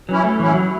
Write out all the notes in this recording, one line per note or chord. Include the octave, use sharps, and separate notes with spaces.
E3 F#3 C#4 E4
A3
A2 E3 F#3 C#4 E4
F#3